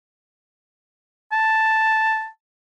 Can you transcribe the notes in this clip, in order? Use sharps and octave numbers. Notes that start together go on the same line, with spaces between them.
A5